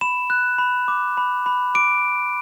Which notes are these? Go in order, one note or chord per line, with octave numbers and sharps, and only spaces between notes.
B5 E7
F#6
B5
D6
B5
B5
D6 D7